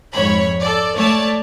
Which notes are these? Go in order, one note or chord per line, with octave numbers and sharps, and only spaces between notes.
F2 G#2 C#5 B5
A4 D5
A3 C#5 D5 A5